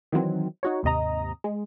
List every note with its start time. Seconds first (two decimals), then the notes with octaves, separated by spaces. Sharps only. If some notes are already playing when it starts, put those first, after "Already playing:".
0.12 D#3 E3 F#3 C4
0.63 D#4 F#4 C#5
0.83 G#1 D#2 C3 D#5 A#5
1.44 G#3